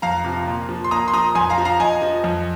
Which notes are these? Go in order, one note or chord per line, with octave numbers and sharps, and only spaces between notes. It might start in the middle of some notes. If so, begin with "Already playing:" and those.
F2 F5 A#5
C3 F3
A#2
F3
C6
A#2 A#5 D#6
C6
F3 A#5 D#6
F2 G#5 C6
F5 A#5
F3
F5 A#5
F2 D#5 G#5
F3
F2